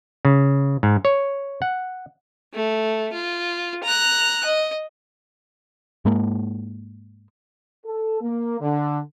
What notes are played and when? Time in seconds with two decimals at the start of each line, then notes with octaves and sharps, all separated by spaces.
0.25 C#3
0.83 G#2
1.05 C#5
1.62 F#5
2.54 A3
3.13 F4
3.84 A#5 F#6
4.45 D#5
6.05 G#2 G#3 A#3
7.85 A4
8.22 A#3
8.61 D3